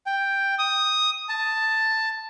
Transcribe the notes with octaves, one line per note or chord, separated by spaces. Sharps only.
G5
D#6
A5